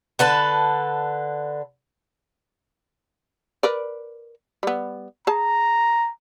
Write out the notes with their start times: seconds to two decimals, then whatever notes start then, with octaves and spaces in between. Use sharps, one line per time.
0.19 D3 B4 A5
3.63 A#4 B4 D5
4.63 G3 B3
5.27 G#4 A5 A#5